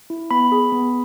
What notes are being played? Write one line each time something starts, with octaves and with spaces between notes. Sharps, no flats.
E4
B3 B5
G#4
B3